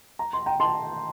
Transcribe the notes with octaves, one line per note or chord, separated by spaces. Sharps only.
A#5
C6
G5 A#5
A5 C6